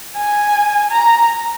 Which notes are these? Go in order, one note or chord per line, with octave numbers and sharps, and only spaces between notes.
G#5
A#5